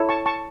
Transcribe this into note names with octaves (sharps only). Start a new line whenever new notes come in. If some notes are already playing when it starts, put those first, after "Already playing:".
Already playing: E4 A4 C#5
A5 C#6
A5 C#6